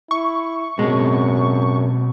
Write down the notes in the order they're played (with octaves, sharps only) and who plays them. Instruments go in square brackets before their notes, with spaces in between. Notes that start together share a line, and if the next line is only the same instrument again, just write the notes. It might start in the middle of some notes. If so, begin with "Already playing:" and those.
[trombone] E4 [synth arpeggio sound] C#6
[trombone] F#2 [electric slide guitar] B2 C4 [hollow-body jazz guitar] G#3